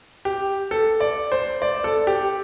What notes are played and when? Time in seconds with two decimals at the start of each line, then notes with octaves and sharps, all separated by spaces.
0.25 G4
0.71 A4
1.00 D5
1.32 C5
1.62 D5
1.84 A4
2.07 G4